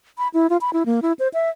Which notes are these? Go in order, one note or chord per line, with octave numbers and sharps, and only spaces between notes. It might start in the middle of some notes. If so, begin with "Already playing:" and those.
B5
E4
F4
B5
E4
A#3
E4
C5
E5